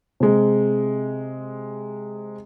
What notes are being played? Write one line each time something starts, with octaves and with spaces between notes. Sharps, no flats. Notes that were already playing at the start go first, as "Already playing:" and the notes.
C3 G#3